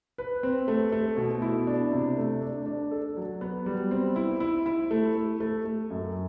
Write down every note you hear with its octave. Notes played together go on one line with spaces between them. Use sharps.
B4
C4
A3
A3
B2
E4
D4
C3
A3
D4
D4
A4
F#3
B3
G3
C4
E4
E4
E4
A3
A3
A3
A3
F#2